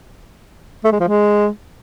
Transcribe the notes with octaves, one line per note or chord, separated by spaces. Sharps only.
A3
G#3
F3
G#3